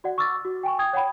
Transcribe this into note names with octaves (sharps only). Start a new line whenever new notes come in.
F#4 D5 F#5
C#6 D6 E6 F6 A6
F#4
G5 G#5 C#6
G5 D#6 G#6
C#5 F#5 G5 B5